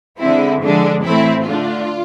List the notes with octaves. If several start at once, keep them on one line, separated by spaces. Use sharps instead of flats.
D3 G#3 C4 E4
D3 F3 G#3 D4
A2 E3 A3 C4 E4
D3 A3 D4 F4